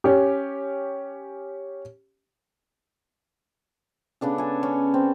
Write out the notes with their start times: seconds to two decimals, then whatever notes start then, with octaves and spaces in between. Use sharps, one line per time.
0.04 C#4 G4
4.21 C#3 B3 D4 A4
4.38 A4 G#5
4.63 C#4
4.94 C4